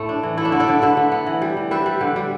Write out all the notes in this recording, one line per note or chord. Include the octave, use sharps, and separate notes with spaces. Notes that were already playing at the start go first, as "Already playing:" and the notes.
Already playing: A2 A3
D4
E3
A3 E4
D4
D3 E4
A4 D5
D3
D3 B4 E5
D3
B3
E3
G3
E3
G3 B4 E5
G3
D3
G3